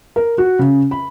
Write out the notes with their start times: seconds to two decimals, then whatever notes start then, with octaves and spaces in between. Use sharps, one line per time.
0.16 A#4
0.38 F#4
0.59 C#3
0.91 B5